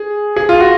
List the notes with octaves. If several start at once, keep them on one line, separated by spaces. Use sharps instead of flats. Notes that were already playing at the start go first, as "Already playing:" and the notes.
Already playing: G#4
G#4
F4
F#4